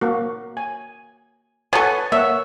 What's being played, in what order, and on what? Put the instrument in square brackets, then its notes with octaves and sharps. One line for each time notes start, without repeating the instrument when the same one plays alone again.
[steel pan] A#3 F#4
G#5
[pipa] B3 A4 [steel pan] B4 C#5 G#5
[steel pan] A#3 C#5 F#5 [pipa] E5